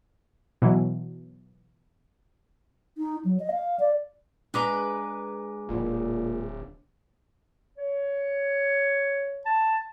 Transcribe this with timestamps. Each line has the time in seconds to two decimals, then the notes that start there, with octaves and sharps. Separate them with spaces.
0.62 B2 E3 F#3
2.98 D#4
3.25 F#3
3.40 D#5
3.52 F5
3.80 D5
4.54 G#3 D4 B4 A#5 D6
5.69 D1 A#2
7.78 C#5
9.46 A5